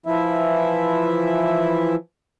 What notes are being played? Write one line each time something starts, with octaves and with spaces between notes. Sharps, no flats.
E3 F3 E4 E5